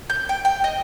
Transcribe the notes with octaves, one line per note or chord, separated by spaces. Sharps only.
G6
G5
G5
D#5